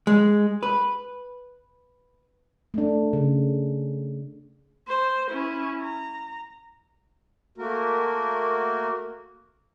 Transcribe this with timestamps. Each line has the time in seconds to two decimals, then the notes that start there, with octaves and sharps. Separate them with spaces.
0.07 G#3
0.63 B4
2.74 A3 D4
3.13 C#3
4.88 C5
5.31 C#4 E4
5.82 A#5
7.58 A3 A#3 F#4 A#4